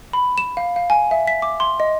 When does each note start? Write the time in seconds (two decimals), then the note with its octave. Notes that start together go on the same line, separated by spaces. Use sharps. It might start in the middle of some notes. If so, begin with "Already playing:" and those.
0.13 B5
0.38 E7
0.57 F5
0.76 F5
0.90 G#5
1.11 E5
1.27 B6
1.42 D6
1.60 C6
1.80 D#5